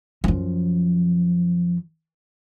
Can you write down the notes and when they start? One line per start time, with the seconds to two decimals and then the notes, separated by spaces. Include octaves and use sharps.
0.24 F#2 F3